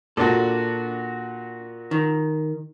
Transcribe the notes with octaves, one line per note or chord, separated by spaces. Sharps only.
A#2 D4 F#4 A4
D#3